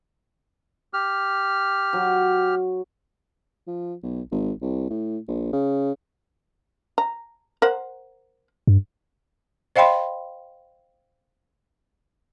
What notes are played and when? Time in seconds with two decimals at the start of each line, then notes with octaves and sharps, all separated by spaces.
0.94 G4 F6
1.93 F#3
3.67 F3
4.03 B1
4.31 G#1
4.61 C2
4.90 A2
5.28 A#1
5.53 C#3
6.98 A#5
7.62 A#4 C5 F#5
8.67 G2
9.76 C5 D#5 F5 G5 B5 C6